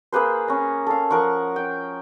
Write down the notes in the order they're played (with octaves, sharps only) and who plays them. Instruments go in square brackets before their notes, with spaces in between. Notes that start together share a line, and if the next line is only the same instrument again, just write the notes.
[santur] A#3 G#4 B4 C5
C#4 A#5
A4 F5
F3 A#4 F#5 C#6
G5